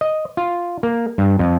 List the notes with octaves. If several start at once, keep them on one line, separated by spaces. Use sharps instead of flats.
D#5
F4
A#3
G2
F2